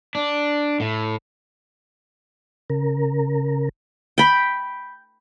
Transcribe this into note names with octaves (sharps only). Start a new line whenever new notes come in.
D4
A2
C#3 A#4
G5 B5